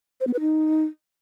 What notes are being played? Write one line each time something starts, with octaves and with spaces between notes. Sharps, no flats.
C5
B3
B4
D#4